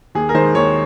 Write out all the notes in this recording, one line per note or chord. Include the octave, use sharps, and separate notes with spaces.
D#2 G#4
A#4
D#3 G#3 C5
D#2 C#5